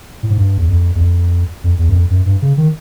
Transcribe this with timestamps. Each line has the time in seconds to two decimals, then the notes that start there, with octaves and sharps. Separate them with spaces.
0.23 A2
0.30 G#2
0.38 G2
0.58 E2
0.69 F2
0.95 E2
1.00 F2
1.64 F2
1.79 E2
1.89 F#2
1.95 F2
2.10 F#2
2.26 G2
2.42 C#3
2.57 D#3